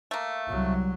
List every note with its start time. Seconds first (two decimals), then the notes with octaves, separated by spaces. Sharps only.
0.11 A3 A#3
0.47 C2 F#3